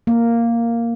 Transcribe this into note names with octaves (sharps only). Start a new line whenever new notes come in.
A#3